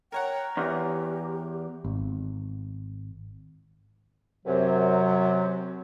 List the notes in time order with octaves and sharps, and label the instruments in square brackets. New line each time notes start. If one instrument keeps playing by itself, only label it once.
[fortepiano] A#4 C#5 F#5 [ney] G5
[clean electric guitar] E2 [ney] G4
[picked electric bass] G#1
[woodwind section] F#2 C3 F#3